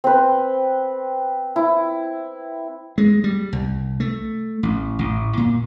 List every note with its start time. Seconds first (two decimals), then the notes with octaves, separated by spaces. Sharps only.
0.04 C4 B4
1.56 E4
2.98 G#3
3.24 G3
3.53 C2
4.00 A3
4.63 A1
4.99 A1
5.37 A#2